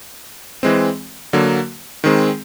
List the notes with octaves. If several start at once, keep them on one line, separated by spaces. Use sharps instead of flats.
E3 G#3 C4
D3 F#3 A#3
D#3 G#3 C4